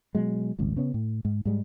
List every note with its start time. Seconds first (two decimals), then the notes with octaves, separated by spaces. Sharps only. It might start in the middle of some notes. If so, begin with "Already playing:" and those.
0.15 B2 F#3 G#3
0.59 D#1 G#1 C#2
0.77 C#3 B3 C#4
0.94 A2
1.25 G#2
1.45 G#2 G3 G#3